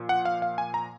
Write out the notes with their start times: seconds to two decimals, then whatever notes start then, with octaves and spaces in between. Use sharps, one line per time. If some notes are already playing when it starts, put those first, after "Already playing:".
Already playing: A#2 F3
0.09 F#5
0.25 F5
0.42 F5
0.58 G#5
0.74 A#5